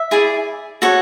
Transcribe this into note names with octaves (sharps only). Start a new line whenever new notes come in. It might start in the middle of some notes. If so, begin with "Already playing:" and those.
Already playing: E5
E4 G#4 D5
F#4 A4 C#5 F#5